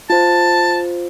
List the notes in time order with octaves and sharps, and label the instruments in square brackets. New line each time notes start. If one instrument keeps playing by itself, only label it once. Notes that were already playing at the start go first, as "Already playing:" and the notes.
[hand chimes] F4 C5 [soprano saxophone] A5